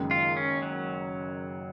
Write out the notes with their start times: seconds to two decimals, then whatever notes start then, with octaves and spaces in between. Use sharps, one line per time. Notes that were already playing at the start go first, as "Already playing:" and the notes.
Already playing: F#1 F#2 D#3 G#3
0.11 F4
0.37 C#4
0.62 F#3